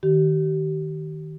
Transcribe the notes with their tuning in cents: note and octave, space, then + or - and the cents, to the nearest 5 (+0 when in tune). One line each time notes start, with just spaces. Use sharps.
D#3 +0 G4 -35